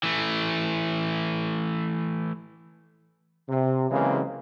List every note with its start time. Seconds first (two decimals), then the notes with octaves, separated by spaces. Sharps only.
0.03 E3 A3
3.49 C3
3.91 C#3 E3 F#3 G#3 A#3 C4